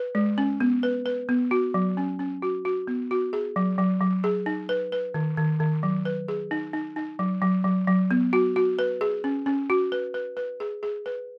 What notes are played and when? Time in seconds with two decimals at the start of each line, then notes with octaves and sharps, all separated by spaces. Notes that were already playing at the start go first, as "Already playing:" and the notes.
Already playing: B4
0.15 G#3
0.38 C#4
0.60 B3
0.83 B4
1.06 B4
1.29 B3
1.51 F#4
1.74 F#3
1.97 C#4
2.19 C#4
2.42 F#4
2.65 F#4
2.87 B3
3.11 F#4
3.33 G#4
3.56 F#3
3.78 F#3
4.01 F#3
4.24 G#4
4.46 D#4
4.69 B4
4.92 B4
5.14 D#3
5.37 D#3
5.60 D#3
5.83 F#3
6.05 B4
6.28 G#4
6.51 D#4
6.73 D#4
6.96 D#4
7.19 F#3
7.42 F#3
7.64 F#3
7.88 F#3
8.11 B3
8.33 F#4
8.56 F#4
8.79 B4
9.01 G#4
9.24 C#4
9.46 C#4
9.70 F#4
9.92 B4
10.14 B4
10.37 B4
10.60 G#4
10.83 G#4
11.06 B4